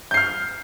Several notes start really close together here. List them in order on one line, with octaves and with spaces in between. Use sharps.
G6 C7 F6